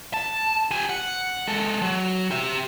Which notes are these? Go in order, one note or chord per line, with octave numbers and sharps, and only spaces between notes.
A5
G4 G#5
F#5
G#3 A4
F#3
G4 E5